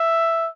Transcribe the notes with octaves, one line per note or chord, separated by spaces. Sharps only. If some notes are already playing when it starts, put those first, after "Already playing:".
Already playing: E5